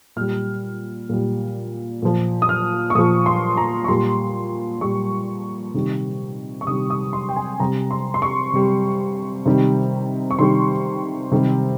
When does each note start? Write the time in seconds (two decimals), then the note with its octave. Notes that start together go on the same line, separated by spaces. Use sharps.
0.16 A#2 G3 F6
1.09 A#2 G3
2.02 A#2 F3
2.42 D#6
2.49 F6
2.90 C#6
2.95 A#2 F3 D#6
3.26 C6
3.57 A#5
3.84 C#6
3.88 A#2 G3 C6
4.81 A#2 G3 C#6
5.74 C3 D#3 G3
6.61 C#6
6.67 C3 D#3 G3 D#6
6.90 D#6
7.13 C6
7.29 G5
7.36 G#5
7.60 C3 G3 A#5
7.91 C6
8.14 C6
8.22 C#6
8.53 C3 G3
9.46 C3 D#3 G3
10.31 C#6
10.39 C3 D#3 G3 C6
11.32 C3 D#3 G3